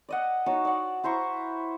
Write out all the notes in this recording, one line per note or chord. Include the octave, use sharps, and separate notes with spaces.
D5 D#5 F#5
D#4 F#4 C#5 A5
D5 F#5
E4 C5 A#5 C#6